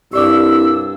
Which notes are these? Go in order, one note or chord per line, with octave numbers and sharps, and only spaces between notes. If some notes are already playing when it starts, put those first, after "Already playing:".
C2 G2 G4 D5 D6 E6